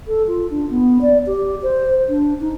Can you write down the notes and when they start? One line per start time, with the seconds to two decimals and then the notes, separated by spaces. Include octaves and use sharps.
0.07 A4
0.28 F4
0.51 D4
0.70 B3
1.02 D5
1.27 G4
1.63 C5
2.09 D4
2.41 D#4